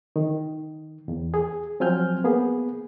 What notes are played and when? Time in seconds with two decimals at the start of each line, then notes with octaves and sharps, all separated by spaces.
0.16 D#3
1.08 E2
1.34 G#4
1.80 F3 F#3 C4 G#5 F6 G6
2.24 A#3 B3 G#4